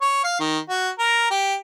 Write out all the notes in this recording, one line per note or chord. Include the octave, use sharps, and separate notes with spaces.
C#5
F5
D#3
F#4
A#4
G4